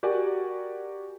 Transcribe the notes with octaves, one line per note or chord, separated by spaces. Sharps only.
F#4 G4 A#4 D5 F#5 G#5